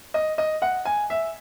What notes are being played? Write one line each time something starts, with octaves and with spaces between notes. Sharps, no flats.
D#5
D#5
F#5
G#5
E5